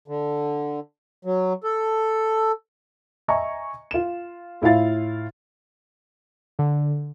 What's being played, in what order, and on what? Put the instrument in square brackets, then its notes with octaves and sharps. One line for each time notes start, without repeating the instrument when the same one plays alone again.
[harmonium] D3
F#3
A4
[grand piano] D#5 E5 G#5 A#5 C#6
F4 E7
A2 E4 F4 E5 F5 A6
[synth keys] D3